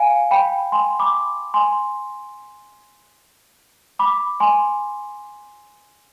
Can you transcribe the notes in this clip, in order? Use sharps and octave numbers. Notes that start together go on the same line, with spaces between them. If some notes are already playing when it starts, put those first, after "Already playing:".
Already playing: F5 G#5
G5 B5
G#5 C6
B5 D6
G#5 C6
B5 D6
G#5 C6